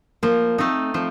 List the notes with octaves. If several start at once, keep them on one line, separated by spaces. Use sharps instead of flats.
F3 A#3
A3 C4 D#4
F3 C4